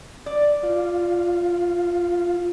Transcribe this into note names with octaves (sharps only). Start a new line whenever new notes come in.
D5
F4